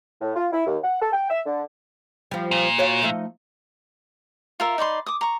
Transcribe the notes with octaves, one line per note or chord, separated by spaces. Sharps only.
A2
F4
E4
D#2
F#5
A4
G5
E5
D3
F3 G3
A#2
F#4 C#5 F5
F3 A3 D#4
F4 A#4 E5
D#4 D5 B5 C6
D6 D#6
A#5 C#6